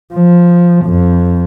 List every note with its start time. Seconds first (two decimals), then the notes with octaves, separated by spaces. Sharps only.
0.14 F3
0.85 F2